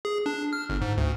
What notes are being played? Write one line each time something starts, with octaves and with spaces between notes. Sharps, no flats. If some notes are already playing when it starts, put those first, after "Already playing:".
G#4
D4
F6
G1
G#2
D2